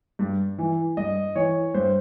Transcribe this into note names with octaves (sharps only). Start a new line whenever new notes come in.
G2
E3
G2 D#5
E3 C#5
G2 C5